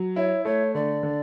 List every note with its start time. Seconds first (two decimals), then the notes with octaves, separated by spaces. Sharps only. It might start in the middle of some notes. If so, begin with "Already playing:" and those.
Already playing: F#3
0.16 E4 C#5
0.45 A3 C#5
0.74 D3 D5
1.03 D3